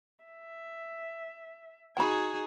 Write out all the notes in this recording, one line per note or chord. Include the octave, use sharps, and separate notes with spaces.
E5
D#4 F#4 G#4 G5 G#5 B5